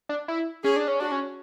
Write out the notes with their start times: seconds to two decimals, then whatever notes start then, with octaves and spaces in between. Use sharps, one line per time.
0.09 D4
0.28 E4
0.63 C#4 G#4
0.76 D4
0.88 C#4
1.00 D4 F#4
1.12 C#4